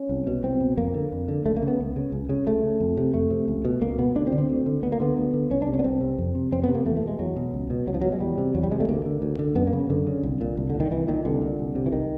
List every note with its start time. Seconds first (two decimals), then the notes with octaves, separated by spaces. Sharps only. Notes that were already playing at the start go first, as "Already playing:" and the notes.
Already playing: C#4
0.09 C2
0.27 B2
0.43 C2 C4
0.60 B2
0.77 F2 A#3
0.94 D3
1.12 F2
1.28 D3
1.45 C#2 A3
1.56 A#3
1.62 C#3
1.68 B3
1.79 C#2
1.96 C#3
2.12 C#2
2.29 C#3
2.46 C#2 A3
2.63 C#3
2.80 F2
2.97 C3
3.14 F2 A3
3.31 C3
3.48 C#2
3.65 B2
3.81 C#2 A#3
3.99 B2 B3
4.15 D2 D4
4.27 C4
4.32 D3
4.38 C4
4.49 D2
4.66 D3
4.83 D2 B3
4.92 A#3
5.00 D3 B3
5.17 D2
5.34 D3
5.51 C2 C#4
5.62 D4
5.67 C3
5.74 C#4
5.79 B3
5.84 C2 C4
6.01 C3
6.18 F2
6.35 C3
6.52 F2 C4
6.64 B3
6.69 C3
6.75 A#3
6.85 E2 A3
6.97 A3
7.02 B2
7.08 G#3
7.19 E2 F#3
7.36 B2
7.54 C#2
7.70 B2
7.87 C#2 F#3
7.94 F3
8.01 B2 F#3
8.12 G#3
8.20 E2 G3
8.38 C3
8.55 E2 F#3
8.63 G3
8.71 C3 G#3
8.80 A3
8.89 D2 A#3
9.06 D3
9.22 D2
9.39 D3
9.55 F#2 B3
9.67 A#3
9.73 C#3
9.89 F#2 D3
10.07 C#3
10.23 C2
10.41 A#2
10.57 C2
10.70 A#2 D3
10.80 D#3
10.91 C2 E3
11.08 A#2 D#3
11.25 C2 D3
11.42 A#2
11.59 C2
11.75 C3
11.86 E3
11.92 C2 D#3